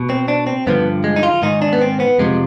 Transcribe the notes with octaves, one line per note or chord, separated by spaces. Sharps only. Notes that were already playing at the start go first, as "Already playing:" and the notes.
Already playing: B2
C4
D4
C4
G2 D3 F3 B3
G#3
D#4
F4
G#2 D#3 D#4
D4
B3
C4
B3
F2 C3 F3 G#3